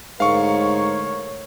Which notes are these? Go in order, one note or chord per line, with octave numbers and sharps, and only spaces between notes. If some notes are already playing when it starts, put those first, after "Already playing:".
G#2 D3 A3 A#4 C#5 F5 C#6